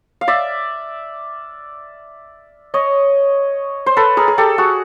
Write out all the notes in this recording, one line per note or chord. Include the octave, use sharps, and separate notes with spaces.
F5
D5 E5
C#5 D#5
C5
A4 B4
G#4 A#4
G#4
G4 A4
F#4 G#4